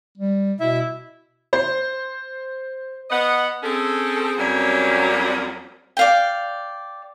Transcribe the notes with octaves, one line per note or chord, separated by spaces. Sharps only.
G3
B2 E4 E5
C5
B3 D#5 F#5
C4 C#4 G#4 A4
F2 F#3 G3 A#3 C4 C#4
D5 F5 G5